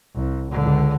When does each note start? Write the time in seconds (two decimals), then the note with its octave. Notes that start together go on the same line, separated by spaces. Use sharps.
0.14 C2
0.51 C#2 D3